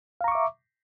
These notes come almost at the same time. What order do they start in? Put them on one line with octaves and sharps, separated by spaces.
F5 A#5 C#6 D6 E5